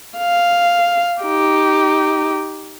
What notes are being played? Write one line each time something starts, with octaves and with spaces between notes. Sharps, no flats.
F5
D#4 G4